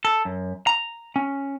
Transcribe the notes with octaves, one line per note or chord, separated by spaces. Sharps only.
A4
F#2
A#5
C#4